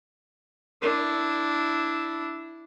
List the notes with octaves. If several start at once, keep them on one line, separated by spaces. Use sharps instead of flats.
D4 E4